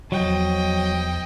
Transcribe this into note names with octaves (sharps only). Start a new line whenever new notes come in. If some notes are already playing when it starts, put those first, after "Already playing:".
E2 F3 F#3 D#5 G5